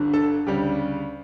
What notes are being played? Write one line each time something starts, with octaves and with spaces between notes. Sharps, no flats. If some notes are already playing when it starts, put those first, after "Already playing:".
Already playing: G1 G2 D3
A4
D2 C#3 G3 G4